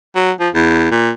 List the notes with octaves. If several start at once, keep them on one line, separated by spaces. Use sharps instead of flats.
F#3
F3
E2
A#2